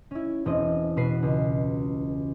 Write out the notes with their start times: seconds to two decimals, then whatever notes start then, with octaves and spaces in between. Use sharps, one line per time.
0.11 C#4 E4
0.45 E1 C4 E4 D#5
0.96 B2 F#4 B4 C7
1.23 C#2